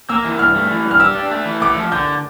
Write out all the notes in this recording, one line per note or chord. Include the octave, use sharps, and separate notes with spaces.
A#3 E6
E3
G2 F6
A3
E3
G2
F6
G4 E6
D4
A3
E3
A3 D6
F3
D3 G6